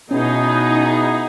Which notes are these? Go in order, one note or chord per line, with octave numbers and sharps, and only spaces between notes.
B2 B3 C#4 D#4 E4 G#4